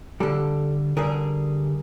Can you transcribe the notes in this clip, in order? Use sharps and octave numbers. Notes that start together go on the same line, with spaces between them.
D3 G3 G4 A4
D3 G3 G#4 A#4